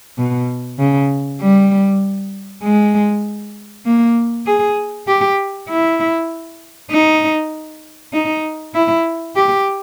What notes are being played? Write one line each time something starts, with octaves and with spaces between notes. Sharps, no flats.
B2
C#3
G3
G#3
A#3
G#4
G4
E4
D#4
D#4
E4
G4